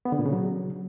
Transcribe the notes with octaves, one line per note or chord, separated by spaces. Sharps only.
B3
D3
A#2
C#3
F#3